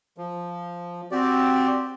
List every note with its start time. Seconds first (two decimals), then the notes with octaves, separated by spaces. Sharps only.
0.18 F3
1.11 C4 F#4 G4 D5